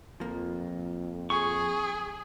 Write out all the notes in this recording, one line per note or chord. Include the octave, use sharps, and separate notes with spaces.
F2 F3 A#3
G#4 C#6